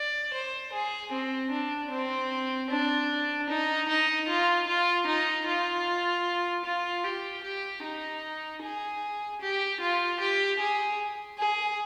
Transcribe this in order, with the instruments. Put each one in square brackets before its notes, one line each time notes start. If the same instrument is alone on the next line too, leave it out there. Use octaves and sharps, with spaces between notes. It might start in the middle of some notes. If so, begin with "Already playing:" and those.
Already playing: [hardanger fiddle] D5
C5
G#4
C4
D4
C4
D4
D#4
D#4
F4
F4
D#4
F4
F4
G4
G4
D#4
G#4
G4
F4
G4
G#4
G#4